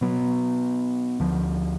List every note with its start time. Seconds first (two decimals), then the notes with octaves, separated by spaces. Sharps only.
0.01 B2 F#3 B3
1.20 D2 D3 F3